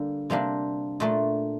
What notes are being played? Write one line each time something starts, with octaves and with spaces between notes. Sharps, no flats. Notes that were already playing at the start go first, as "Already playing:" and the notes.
Already playing: D3 G3 A#3
C3 G3 A#3 D4
A#2 A3 D4